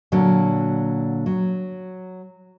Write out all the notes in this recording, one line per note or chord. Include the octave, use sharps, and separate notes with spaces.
A#2 D3 F#3
F#3